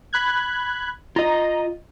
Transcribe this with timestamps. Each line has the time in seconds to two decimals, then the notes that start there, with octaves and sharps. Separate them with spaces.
0.13 B5 F#6 G#6
1.16 F4 D#5 A#5